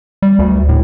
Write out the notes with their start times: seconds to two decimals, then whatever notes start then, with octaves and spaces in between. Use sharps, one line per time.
0.22 G3
0.39 D2
0.69 A2